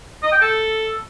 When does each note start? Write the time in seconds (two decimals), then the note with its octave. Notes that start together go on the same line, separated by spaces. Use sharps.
0.23 D#5
0.32 G5
0.41 A4